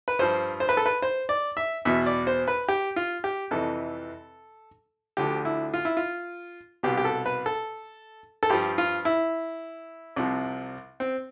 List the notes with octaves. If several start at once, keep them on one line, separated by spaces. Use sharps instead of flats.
B4
G2 F3 C5
C5
B4
A4
B4
C5
D5
E5
E2 B2 E5
D5
C5
B4
G4
F4
G4
F2 C3 E3 A4
D2 D3 F3 G4
E4
F4
E4
F4
C2 B2 G4
G4
A4
B4
A4
A4
G2 F3 G4
F4
E4
C2 C3 F3
C4